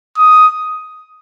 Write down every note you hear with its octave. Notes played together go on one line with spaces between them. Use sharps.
D#6